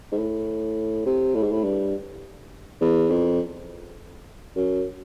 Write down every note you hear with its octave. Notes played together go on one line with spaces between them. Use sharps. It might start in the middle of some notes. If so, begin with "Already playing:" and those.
G#2
A2
C3
A2
G#2
A2
G2
E2
F2
F#2